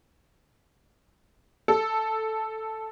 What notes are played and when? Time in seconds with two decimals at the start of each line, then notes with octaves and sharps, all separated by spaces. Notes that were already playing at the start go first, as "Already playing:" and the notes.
1.68 A4